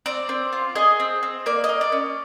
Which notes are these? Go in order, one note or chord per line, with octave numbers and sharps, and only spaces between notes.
C4 D5
C4
F4
G#4 D#5
C4
C4
A#3 D5
A#3 D#5
D5
C#4